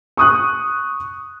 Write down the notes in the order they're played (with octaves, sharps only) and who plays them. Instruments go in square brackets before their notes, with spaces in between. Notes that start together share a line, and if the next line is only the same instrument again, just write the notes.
[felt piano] C#6 D#6 F#6